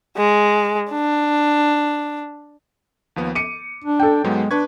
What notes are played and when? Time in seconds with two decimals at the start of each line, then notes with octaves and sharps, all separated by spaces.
0.17 G#3
0.91 D4
3.16 D#2 F3 B3
3.35 D6 C#7 D#7
3.84 D4
3.99 A4 G5
4.24 G#2 F#3 G#3 B3
4.51 D4 B4 C#6 G#6